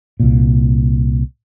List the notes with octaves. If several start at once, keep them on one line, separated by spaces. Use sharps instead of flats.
C2 A#2